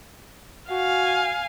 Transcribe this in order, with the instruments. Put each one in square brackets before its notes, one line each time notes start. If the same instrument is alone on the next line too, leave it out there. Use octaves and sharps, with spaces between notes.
[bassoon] F#4 [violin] F5 G#5